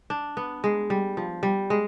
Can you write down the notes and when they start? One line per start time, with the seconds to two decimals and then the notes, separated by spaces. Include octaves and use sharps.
0.10 D4
0.37 B3
0.64 G#3
0.90 G3
1.17 F3
1.43 G3
1.70 G#3